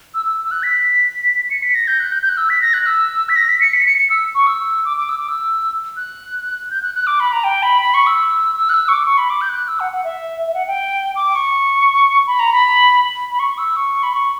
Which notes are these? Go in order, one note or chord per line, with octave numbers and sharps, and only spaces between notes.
E6
E6
E6
F#6
B6
C#7
B6
A#6
G6
F#6
G6
G6
F#6
E6
B6
A#6
F#6
E6
B6
A#6
B6
C#7
B6
C#7
C#7
E6
C#6
E6
D6
D6
E6
D6
E6
F#6
G6
F#6
F#6
D6
B5
A#5
G5
B5
B5
C#6
E6
E6
F#6
E6
C#6
D6
C#6
B5
D6
G6
F#6
E6
F#5
F#5
E5
E5
F#5
G5
D6
C#6
B5
A#5
B5
B5
C#6
E6
C#6
B5
C#6